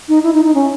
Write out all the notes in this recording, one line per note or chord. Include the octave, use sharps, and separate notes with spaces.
D#4
E4
D#4
D#4
C#4